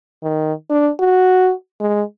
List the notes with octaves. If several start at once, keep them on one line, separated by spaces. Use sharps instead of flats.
D#3
D4
F#4
G#3